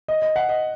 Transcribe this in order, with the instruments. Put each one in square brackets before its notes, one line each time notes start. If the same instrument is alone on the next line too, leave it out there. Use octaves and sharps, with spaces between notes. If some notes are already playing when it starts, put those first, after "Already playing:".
[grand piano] D#5
D#5
F#5
D#5